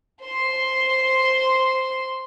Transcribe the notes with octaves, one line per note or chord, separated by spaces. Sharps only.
C5 C6